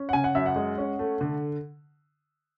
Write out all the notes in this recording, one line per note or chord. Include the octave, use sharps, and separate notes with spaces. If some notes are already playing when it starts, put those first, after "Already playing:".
Already playing: C#4
F#5
C#3 G#5
F#5
F#2 E5
F#5
G#3
C#4
A3
D3